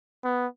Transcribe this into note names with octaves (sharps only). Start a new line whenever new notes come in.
B3